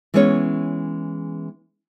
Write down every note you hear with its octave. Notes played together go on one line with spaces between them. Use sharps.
E3 G#3 B3 C#4 C5 C#5